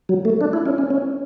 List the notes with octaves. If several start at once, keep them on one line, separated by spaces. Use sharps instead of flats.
F#3
A3
D4
E4
C#4
C#4
C#4